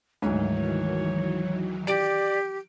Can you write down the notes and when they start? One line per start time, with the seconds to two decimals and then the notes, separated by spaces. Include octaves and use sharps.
0.22 D2 G#2 D#3 E3 F#3 C#5
1.87 G4 D5 D7